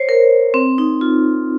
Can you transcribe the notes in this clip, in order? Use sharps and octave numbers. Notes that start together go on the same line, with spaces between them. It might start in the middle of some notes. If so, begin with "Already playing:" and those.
Already playing: C5 C#5
A#4
C4
D#4
F4